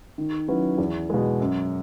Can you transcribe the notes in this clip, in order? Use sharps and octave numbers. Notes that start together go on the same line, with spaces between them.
D#3
F#3 C#4 E4 B4
E2
B2 G#3
F#2